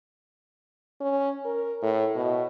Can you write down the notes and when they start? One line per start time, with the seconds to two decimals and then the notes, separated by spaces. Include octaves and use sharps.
1.00 C#4
1.45 A#4
1.82 A2
2.16 B2